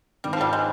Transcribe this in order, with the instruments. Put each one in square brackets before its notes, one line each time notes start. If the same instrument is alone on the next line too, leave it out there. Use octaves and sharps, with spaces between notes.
[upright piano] G#1 [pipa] G3
[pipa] F3
G3
G#3